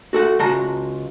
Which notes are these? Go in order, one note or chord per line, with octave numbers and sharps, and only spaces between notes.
F#4 A4 F#5
C#2 G#3 F#4 A5 A#5